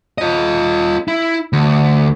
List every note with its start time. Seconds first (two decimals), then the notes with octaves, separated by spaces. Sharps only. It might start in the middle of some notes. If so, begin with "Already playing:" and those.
0.18 F4 D#5
1.08 E4
1.53 D2